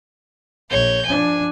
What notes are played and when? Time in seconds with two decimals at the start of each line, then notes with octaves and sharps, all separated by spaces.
0.70 A#1 C#5 G6
1.06 F3 D4 G#5